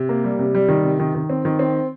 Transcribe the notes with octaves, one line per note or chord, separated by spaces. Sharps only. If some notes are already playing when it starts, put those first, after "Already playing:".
Already playing: C3
A#3
G3
C3
G3
D#3
C3
D#3
D#3
C4
D#3
C4